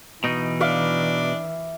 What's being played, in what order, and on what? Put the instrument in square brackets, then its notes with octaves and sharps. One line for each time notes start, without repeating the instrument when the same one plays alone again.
[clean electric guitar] B2 D#4 [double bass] E3
[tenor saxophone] D4 [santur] E5 F5 D6